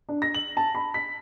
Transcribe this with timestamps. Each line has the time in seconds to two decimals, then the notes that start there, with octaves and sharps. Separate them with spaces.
0.09 D4
0.22 A#6
0.34 F#7
0.57 A5
0.75 B5
0.94 B6